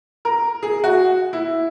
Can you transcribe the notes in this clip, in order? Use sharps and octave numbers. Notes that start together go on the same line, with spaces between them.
A#4
G#4
F#4
E4